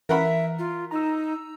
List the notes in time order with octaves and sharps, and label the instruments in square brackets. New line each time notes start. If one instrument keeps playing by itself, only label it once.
[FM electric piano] E3 [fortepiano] A#4 F#5 B5 [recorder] E5
[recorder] F4
[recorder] D#4 [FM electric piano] A#5 E6